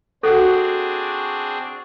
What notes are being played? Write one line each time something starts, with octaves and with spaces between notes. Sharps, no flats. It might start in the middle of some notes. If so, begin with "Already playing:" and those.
C4 D4 F#4 G#4 A4